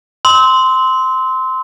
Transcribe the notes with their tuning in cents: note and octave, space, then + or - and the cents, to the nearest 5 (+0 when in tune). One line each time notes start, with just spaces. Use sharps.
C6 -10 E6 -35